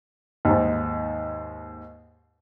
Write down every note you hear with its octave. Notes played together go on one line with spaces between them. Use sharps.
D#2 G#2